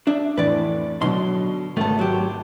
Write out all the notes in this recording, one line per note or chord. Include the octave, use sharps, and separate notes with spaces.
D4 E5
F2 A2 E3 B4 D5
B1 B2 D3 F#3 C6
G#1 C#2 A3 B3 A5
F#3 G4